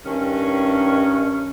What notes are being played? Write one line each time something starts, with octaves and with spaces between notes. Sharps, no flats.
G2 D#3 C#4